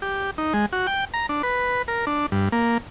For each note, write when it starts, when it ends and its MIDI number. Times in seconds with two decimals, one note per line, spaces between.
0.02 0.31 67
0.38 0.53 63
0.54 0.66 56
0.73 0.87 66
0.87 1.05 79
1.14 1.26 82
1.29 1.42 62
1.43 1.82 71
1.88 2.05 70
2.07 2.26 62
2.32 2.49 43
2.52 2.78 58